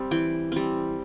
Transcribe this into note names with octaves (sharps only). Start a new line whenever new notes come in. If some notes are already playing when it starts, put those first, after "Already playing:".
Already playing: G3 C4
E3 G5
G3 C4